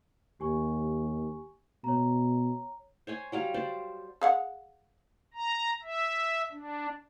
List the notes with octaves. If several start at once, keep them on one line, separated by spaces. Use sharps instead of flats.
D#2 G4 G#5 C#6
B2 C#5 A#5
C5 C#5 G#5
F#3 G3 F5
C5 D5 A5
G#4 F5 F#5
A#5
E5
D4